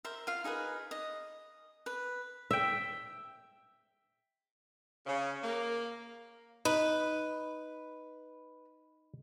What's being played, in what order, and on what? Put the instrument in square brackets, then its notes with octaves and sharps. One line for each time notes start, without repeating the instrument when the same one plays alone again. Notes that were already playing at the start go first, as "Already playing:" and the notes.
[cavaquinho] A#4 C5 E5
F4 F5
D#4 G#4 A#4 B4
D#5
B4
[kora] E5 G5
[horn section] C#3
A#3
[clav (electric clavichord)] D#4 [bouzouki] B4